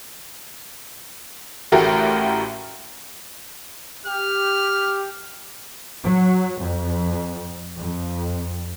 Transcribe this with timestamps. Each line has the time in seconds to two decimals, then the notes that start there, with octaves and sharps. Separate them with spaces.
1.72 A1 A2 A3 F#4 G4 A#4
4.07 G4 F6
6.04 F#3
6.60 F2
7.78 F2